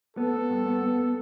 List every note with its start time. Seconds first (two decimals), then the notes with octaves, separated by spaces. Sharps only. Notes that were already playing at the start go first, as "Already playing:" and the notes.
0.17 B3 A4
0.34 B3
0.50 G2
0.66 B3
0.82 B3